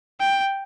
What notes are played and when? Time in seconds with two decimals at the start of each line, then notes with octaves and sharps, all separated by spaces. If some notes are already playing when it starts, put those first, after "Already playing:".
0.20 G5